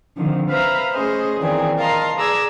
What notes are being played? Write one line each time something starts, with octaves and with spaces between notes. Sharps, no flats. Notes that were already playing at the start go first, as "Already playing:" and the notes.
D3 D#3 F3 C4
B4 C5 E5 F5 A#5 B5
A3 C#4 G#4 C5 D#5
A#2 D#3 E3 C4 G#4
A#4 D#5 F5 A5 A#5 C6
G#4 B4 D5 A#5 E6 G#6